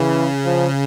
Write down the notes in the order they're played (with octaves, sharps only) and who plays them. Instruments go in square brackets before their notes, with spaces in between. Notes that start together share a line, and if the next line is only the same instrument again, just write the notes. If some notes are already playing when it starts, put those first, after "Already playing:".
Already playing: [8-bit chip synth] C#3 [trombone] E3
[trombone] F3